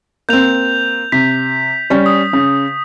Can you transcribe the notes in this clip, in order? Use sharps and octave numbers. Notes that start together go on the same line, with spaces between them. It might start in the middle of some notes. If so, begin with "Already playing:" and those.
A#3 C4 G6 F7
C3 B6
G3 C#4
D#6
C#3